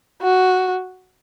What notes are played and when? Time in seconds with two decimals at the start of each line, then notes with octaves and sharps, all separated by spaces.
0.22 F#4